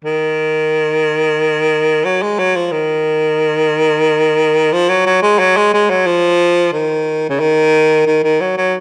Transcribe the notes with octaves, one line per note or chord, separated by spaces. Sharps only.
D#3
F#3
G#3
F#3
F3
D#3
F3
F#3
F#3
G#3
F#3
G#3
G#3
F#3
F3
D#3
C#3
D#3
D#3
D#3
F#3
F#3